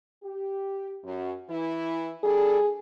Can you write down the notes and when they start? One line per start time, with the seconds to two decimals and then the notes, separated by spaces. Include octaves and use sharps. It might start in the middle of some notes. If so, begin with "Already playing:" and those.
0.23 G4
1.04 F#2
1.50 E3 E4
2.24 G3 D4 G#4 A4